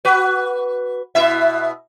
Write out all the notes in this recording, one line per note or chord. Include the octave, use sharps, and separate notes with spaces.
F#4 B4
B2 E4 E5